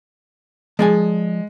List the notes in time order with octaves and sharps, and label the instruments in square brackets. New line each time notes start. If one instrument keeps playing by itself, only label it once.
[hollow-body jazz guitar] F3 D5 G#5 [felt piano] G#3